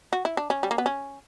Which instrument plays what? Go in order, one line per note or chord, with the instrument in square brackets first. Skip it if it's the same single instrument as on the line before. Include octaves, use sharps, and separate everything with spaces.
[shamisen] F#4
E4
D4
C#4
G3
A#3
B3
C#4